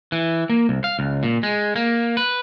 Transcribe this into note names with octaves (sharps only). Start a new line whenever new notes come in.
E3
A#3
C2
F5
C#2
A#2
G#3
A#3
B4